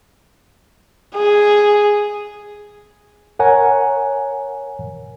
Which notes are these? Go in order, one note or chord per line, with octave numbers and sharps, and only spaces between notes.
G#4
A#4 C#5 F#5 G#5 A#5